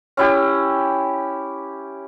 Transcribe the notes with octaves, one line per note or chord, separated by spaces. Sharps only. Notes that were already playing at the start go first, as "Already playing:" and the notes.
C#4 E4 G4